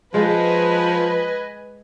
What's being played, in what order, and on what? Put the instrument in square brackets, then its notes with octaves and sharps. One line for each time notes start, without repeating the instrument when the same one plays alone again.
[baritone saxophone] F3 [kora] G#3 [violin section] B4 D#5 G#5